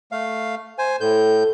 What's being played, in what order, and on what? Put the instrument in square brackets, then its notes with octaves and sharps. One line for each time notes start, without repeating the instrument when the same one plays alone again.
[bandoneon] A3 F5
C5 G#5
[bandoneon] A2 G6 [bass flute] A4